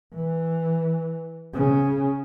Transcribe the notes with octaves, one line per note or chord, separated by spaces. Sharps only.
E3
C#3